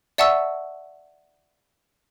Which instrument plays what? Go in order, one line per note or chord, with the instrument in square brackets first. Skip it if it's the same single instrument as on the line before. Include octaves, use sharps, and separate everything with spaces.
[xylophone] D5 E5 F#5 A5 C#6 E6